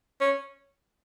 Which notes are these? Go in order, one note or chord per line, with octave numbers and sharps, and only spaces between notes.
C#4